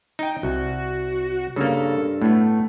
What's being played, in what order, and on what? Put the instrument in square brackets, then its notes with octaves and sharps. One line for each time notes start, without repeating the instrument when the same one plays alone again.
[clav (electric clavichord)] D#4 G5
[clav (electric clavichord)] C2 [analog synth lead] F#4
[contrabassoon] G2 [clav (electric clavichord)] C#3 A#3 [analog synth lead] A4
[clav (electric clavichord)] A2 B3 [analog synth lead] A3